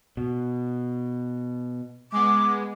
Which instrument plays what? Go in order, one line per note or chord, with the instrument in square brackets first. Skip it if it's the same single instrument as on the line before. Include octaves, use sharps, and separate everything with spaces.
[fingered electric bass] B2
[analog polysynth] G#3 B3 [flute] D6